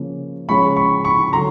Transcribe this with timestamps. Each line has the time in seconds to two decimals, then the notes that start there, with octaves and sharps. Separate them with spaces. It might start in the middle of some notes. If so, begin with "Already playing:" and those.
Already playing: C#3 F3 A#3
0.49 C#3 F3 G#3 C#4 B5 C#6
0.76 B5 C#6
1.04 B5 C#6
1.33 D3 F#3 A#5 C6